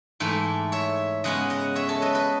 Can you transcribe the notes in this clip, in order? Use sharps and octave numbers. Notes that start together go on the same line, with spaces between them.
G#2 E3 A3
C#5 E5
C#3 G#3 B3 D#5 F#5
D#5 F#5
C#5 E5
A4 C#5
B4 D#5
B4 D#5